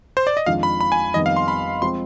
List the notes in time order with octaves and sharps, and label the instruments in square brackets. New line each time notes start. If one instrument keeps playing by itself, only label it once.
[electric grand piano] C5
D5
D#5
[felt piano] F2 D#3 G#3 D4 F4 [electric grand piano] F5
[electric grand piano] B5
B5
G#5
[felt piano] F2 D#3 G3 B3 D#4 [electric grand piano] D#5
[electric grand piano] F5
C6
B5
[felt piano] F3 G#3 C4 [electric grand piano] C6